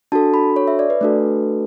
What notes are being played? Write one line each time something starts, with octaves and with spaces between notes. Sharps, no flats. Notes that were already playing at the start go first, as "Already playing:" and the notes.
D4 F#4 A4 A5
B5
C#5
E5
D5
B4
A3 D4 F#4 A4